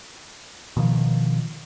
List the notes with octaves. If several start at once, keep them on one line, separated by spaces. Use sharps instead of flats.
B2 D#3 F3